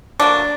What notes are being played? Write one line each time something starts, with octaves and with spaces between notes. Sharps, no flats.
D3 F#3 A#3 D4